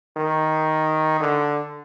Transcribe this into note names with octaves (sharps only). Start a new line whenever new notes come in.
D#3
D3